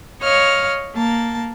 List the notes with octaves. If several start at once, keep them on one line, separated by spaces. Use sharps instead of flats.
C#5 D#5 F5 F6
A#3 A5